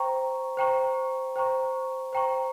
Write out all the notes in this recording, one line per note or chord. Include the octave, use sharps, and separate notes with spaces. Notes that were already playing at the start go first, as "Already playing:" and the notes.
Already playing: C5 G5 A#5 C#6
C5 G5 A#5 C#6
C5 G5 A#5 C#6
C5 G5 A#5 C#6